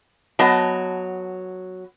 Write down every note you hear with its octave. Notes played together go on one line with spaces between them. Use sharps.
F#3 B3 D#5 A5